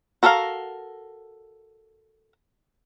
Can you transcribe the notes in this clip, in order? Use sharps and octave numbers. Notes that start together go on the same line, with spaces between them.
F#4 A4 A#4 E5 F5